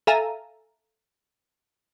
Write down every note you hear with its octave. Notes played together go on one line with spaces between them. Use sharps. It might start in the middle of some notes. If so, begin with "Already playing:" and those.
A4 E5 F5 G#5 A#5 D#7